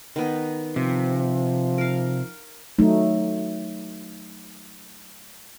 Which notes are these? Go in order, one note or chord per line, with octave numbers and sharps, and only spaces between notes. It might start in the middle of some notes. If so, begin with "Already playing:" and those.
D#3 B3
C3 F3
A#4 F5
F#3 A3 D#4